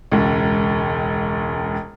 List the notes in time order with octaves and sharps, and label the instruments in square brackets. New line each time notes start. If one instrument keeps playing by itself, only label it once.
[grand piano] E1 C#2